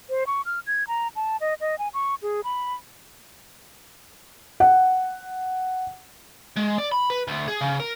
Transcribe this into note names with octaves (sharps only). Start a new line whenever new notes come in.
C5
C#6
F6
G#6
A#5
A5
D#5
D#5
G#5
C#6
G#4
B5
F#5
G#3
D5
B5
B4
D2
G#4
C#3
A#4